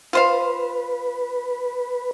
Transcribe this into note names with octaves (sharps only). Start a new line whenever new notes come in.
F4 B4 C5 F5